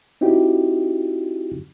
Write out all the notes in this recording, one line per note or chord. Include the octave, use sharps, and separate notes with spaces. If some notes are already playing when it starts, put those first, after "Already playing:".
C4 D#4 E4 F#4 G4